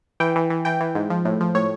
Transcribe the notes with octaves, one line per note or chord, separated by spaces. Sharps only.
E3 G5
E3
E3
E3 G5
E3
G#2
F3
A2
F3
A2 C#5